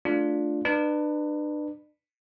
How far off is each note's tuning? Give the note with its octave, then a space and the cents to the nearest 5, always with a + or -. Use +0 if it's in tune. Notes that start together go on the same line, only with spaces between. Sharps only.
A3 +0 D4 +0 F4 +0
D4 +35 B4 +0